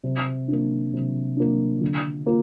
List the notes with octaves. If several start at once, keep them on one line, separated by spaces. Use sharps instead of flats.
C3
A#3 D4
C3
A#3 D4
D3
A#3 F4